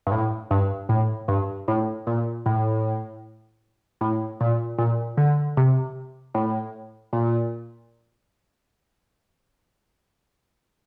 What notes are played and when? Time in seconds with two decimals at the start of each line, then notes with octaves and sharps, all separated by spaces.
0.07 G2
0.12 A2
0.51 G2
0.89 A2
1.28 G2
1.68 A2
2.07 A#2
2.46 A2
4.01 A2
4.41 A#2
4.78 A#2
5.17 D3
5.57 C3
6.35 A2
7.13 A#2